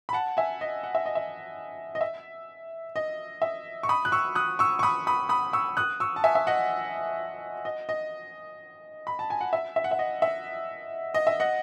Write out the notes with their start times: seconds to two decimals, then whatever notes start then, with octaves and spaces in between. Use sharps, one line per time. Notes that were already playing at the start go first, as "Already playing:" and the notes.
0.09 B5
0.13 F#5 A5
0.37 E5 G#5
0.61 D#5
0.83 F#5
0.95 E5
1.06 D#5
1.15 E5
1.95 D#5
2.01 E5
2.96 D#5
3.42 E5
3.83 C#6
3.89 B5 D#6
4.05 F#6
4.12 C#6 E6
4.35 D#6 F#6
4.59 C#6 E6
4.79 C#6
4.83 B5 D#6
5.07 B5 D#6
5.29 B5 D#6
5.53 C#6 E6
5.77 D#6 F#6
6.00 C#6 E6
6.16 A5
6.24 E5 G#5
6.35 E5
6.47 D#5 F#5
7.65 D#5
7.89 D#5
9.07 B5
9.19 A5
9.30 G#5
9.41 F#5
9.53 E5
9.76 E5
9.84 F#5
9.91 E5
9.99 D#5
10.22 E5
11.14 D#5
11.27 E5
11.40 D#5 F#5